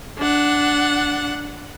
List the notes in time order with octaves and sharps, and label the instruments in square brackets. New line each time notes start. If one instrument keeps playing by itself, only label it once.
[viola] D4 F#5